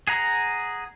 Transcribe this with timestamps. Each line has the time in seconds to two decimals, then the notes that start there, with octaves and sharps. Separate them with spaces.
0.07 G#4 F#5 A#5